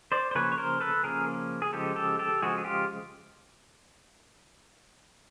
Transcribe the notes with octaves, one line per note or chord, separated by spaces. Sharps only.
C5 D5
C5
C#3 F3 A#3 C#4 B4 C#5
C#5
A#4 C5
A4 B4
C#3 F3 A#3 C#4 G#4 A#4
G#4
C#3 F3 G#3 G4 A4
G4 A4
G4 A4
C#3 F3 G#3 F#4 G#4
G#4
F4 G4